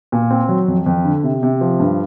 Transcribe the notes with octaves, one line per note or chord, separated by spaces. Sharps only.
A#2
C4
F#3
F2
F2
D3
C3
C3
F3
G2